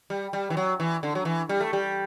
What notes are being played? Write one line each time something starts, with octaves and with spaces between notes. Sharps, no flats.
G3
G3
E3
F#3
E3
D3
F#3
E3
G3
A3
G3